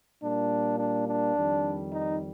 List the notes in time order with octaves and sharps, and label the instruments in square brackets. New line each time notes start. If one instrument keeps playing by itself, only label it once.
[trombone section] A#2 G3 A#3 D4
D4
D4
F2 D#3 G3
D#4